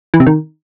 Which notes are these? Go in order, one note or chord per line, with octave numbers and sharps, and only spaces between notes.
E3
C3
D#3